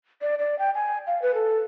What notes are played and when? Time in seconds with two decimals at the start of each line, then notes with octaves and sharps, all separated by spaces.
0.22 D5
0.39 D5
0.59 G5
0.74 G#5
1.07 F5
1.22 B4
1.34 A4